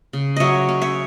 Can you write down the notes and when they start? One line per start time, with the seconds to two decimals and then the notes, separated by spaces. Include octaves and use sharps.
0.13 C#3
0.36 F#3 C#5 D#5 E5
0.69 C#4
0.82 C#5 E5